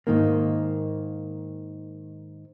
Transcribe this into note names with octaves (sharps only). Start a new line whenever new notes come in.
G#2 D#3 A#3